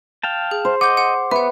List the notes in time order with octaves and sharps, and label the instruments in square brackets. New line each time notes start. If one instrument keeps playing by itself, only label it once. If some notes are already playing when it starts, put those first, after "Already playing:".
[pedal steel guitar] F5 G5 A5
[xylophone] G#4
[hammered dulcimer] C5
[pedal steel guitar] D#5 [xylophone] F#5 G6 [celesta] D6
[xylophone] F#5
[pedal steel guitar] B3 [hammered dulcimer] B4 [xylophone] E5 F#5